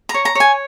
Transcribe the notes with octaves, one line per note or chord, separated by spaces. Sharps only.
A#5
C#5
A#5
C#5 G#5